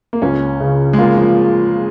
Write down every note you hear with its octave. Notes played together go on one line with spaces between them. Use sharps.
A#3
C#2 C#4
C#3
G#3
A#3 F4
F3